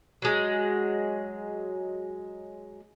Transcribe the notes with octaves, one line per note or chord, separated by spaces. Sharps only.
F#3 G#3